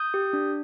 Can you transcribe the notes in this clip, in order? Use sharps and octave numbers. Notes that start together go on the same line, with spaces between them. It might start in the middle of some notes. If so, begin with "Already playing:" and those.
Already playing: D#6 G6
G4
D4